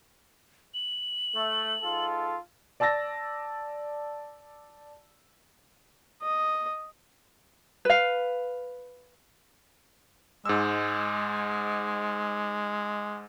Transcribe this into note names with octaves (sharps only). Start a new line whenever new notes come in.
F#7
A3
G#2 F4 A4
D5 A5 E6 A6 A#6
D#5
B4 F5
G#2 G#3 E6